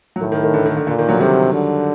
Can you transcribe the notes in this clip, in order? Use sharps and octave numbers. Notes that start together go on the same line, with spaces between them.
F#3
A2 D#3
D#3
D#3
D3
D#3
D3
A#2 D3
D#3
D3 F#3
C3 D#3 G3
D3